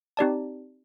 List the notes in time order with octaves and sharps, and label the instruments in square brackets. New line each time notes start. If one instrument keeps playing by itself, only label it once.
[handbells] C4 D#4 G4 D5 A5